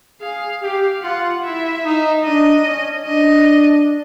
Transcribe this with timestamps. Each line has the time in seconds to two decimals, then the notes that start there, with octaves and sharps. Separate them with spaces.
0.21 G#4 F5
0.62 G4 F5
1.03 F4 F#5
1.44 E4 E5
1.85 D#4
2.24 D4 D#5
2.65 C#4
3.06 D4 D#5